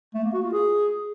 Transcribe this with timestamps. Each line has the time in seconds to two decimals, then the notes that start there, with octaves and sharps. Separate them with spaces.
0.14 A3
0.24 A#3
0.33 F#4
0.43 F4
0.52 G#4